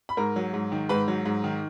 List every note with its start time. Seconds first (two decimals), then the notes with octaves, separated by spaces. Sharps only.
0.09 B5
0.17 G#2 A#4 A#5
0.36 F#3
0.54 G#2
0.72 D#3
0.89 G#2 B4 B5
1.08 F#3
1.26 G#2
1.44 D#3